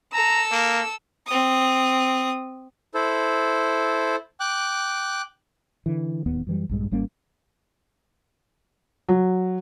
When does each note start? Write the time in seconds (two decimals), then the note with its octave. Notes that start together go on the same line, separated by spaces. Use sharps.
0.13 A4 A#5 E6
0.51 A#3
1.27 C4 D#6
2.94 E4 A4 C5
4.40 G5 D6 F#6
5.86 D3 E3
6.26 D1 D#2 B3
6.47 F#2 E3 G3
6.69 A#1 G2 G#3
6.91 G#1 G3 A#3 C#4
9.09 F#3